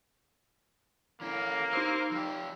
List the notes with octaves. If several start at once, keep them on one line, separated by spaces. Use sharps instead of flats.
E3 A#3 C#4
D#4 C5 C6 E6
F3 G4